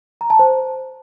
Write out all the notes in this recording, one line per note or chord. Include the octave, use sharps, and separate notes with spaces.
A#5
A5
C5